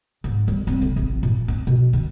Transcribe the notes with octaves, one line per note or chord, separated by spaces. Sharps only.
G#2
G3
C4
D3
A1
A#2
C#4
B2
D#3